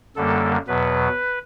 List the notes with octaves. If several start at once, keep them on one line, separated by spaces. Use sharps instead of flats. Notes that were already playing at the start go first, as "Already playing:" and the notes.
F#2 D3 G3 A#3 A4
E2 B2 F#3 B4